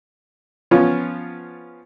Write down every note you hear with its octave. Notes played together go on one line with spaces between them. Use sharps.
F3 B3 C#4 F4